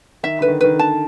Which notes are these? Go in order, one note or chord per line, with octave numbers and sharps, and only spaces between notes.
D#3 E5
D3 B4
D#3
D#3 B4
D3
A5